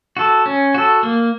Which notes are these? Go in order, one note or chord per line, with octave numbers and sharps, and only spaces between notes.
F#4 A4
C#4
F#4 A4
A#3